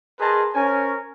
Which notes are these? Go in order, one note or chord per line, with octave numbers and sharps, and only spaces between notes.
G#4 A#4 B4 D#5 A5 C6
C#4 A#4 C5 C#5 G#5